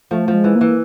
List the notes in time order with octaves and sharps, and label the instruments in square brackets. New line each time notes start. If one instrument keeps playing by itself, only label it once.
[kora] F3 [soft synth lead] A3
[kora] F3
[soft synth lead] G#3
[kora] E3
[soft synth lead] A#3
[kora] E3